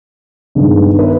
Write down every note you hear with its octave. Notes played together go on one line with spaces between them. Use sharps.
G2 D#3 G#3 B3
B4